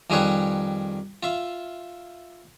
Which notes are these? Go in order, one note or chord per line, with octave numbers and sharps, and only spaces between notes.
F2 D#3 G3 G#4 B4 C#5
F4 E5